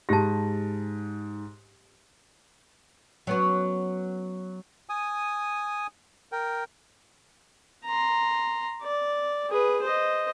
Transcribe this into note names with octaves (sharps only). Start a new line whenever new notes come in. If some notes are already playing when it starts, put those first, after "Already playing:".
G#2 G4 A5 A#6
F#3 B3 C#4
G#5 D#6
A#4 G5
A#5 C6
D5
G#4 B4
C5 D#5